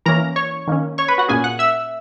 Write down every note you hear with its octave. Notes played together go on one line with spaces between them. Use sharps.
E3 A#3 C#4 A#4 A#5
C#5 C#6
D#3 A#3 C#4
C#5 C#6
B4 B5
F#4 F#5
A#2 A#3 C#4 G#4 G#5
F#5 F#6
E5 E6